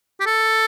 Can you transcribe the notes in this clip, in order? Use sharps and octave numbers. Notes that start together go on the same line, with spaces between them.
G4
A4